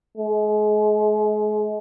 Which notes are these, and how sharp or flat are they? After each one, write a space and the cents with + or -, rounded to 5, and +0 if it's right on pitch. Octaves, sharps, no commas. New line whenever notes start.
G#3 +35